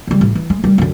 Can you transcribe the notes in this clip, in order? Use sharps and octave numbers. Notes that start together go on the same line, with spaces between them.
C#3 G3
A1
E3
G#3
D#3 G3
F#2 D3